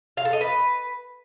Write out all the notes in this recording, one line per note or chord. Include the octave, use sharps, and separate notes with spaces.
F5
A4
D#5
B4